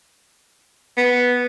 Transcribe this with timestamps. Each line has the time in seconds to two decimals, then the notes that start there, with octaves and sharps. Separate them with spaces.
0.97 B3